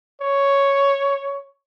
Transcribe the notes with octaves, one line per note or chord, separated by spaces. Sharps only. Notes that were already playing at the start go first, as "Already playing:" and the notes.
C#5